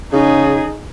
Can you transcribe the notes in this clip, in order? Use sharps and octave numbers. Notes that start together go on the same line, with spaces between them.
C#3 D#4 G#4